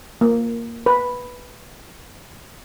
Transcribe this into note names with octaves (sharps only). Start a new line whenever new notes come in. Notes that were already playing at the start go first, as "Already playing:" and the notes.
A#3
B4